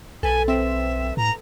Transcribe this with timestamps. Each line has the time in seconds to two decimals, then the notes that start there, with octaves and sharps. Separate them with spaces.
0.23 B1 A4 B4 G#5
0.48 C4 E5
1.17 A2 A#5